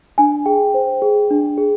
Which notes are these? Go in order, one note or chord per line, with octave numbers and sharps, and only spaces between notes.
D4 G#5
G#4 G5
C5
G#4
D4
G#4